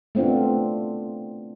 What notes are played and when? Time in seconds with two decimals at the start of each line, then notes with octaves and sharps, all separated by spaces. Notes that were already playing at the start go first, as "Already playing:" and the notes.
0.15 A3 B3 C4 D4 F4